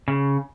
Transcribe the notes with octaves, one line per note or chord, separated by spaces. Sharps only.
C#3